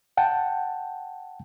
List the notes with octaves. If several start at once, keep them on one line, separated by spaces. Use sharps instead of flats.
F#5 G5 A5